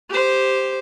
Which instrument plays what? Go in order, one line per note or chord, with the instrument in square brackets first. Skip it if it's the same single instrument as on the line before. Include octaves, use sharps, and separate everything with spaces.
[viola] G4 C5